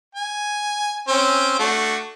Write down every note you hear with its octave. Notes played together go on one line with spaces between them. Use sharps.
G#5
C4 C#4
A3 D4 F#4